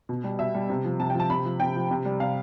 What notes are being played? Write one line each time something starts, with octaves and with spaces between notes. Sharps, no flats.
B2
G3
B2 E5
G3
C3
F3
C3 A5
G5
F3
A5
C3 B5
F3
C3 G5
F3
C3
G3
C3 F5